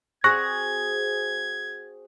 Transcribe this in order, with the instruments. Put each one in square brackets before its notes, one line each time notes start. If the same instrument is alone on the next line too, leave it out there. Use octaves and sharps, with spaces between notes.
[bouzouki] C4 F#4 G#4 [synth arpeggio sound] C#6 F#6 A#6 [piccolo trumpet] G#6